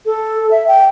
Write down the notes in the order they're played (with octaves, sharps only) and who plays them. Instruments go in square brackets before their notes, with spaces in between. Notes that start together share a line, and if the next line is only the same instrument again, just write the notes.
[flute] A4
E5
G5